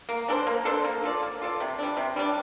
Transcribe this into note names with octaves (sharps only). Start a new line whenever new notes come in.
A#3
D4 A4 C5
A#3
D4 A4 C5
A#3
F4 A4 D5
A#3
F4 A4 D5
C3
G3 D4
C3
G3 D4